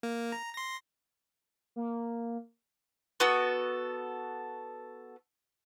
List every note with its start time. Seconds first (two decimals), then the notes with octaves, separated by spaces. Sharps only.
0.03 A#3
0.32 A#5
0.54 C6 A#6
1.76 A#3
3.20 B3 F#4 A4